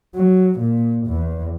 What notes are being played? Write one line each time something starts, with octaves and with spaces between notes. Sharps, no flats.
F#3
A#2
E2